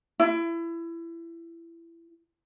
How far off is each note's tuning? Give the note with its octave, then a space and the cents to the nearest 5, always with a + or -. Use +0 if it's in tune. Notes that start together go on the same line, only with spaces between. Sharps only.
E4 +25